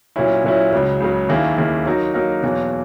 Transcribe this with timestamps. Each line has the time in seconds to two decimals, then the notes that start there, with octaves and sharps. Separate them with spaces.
0.16 A#2 F#3 C#4 E4
0.44 A#2 F#3 C#4 E4
0.73 C#2 C#3 F#3
1.00 C#2 C#3 F#3
1.29 D#2 D#3 A#3 E4 G#4
1.58 D#2 D#3 A#3 E4 G#4
1.86 F#3 A#3 D#4 F#4 A#4
2.14 F#3 A#3 D#4 F#4 A#4
2.43 E2 B2 F#3 A#3